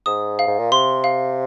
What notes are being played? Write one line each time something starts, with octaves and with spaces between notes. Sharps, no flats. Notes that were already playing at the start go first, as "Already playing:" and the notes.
G#2 D#6
F5
G#2
A#2
C3 C6
F5